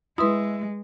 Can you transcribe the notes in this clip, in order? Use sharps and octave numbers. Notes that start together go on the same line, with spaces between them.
G#3 E4 B4 C6 D#6